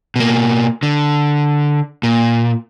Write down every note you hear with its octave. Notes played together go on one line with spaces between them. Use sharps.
B2 A#3
D3
A#2